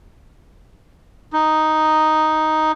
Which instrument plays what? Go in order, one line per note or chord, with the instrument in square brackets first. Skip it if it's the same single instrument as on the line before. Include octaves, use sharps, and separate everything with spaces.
[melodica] D#4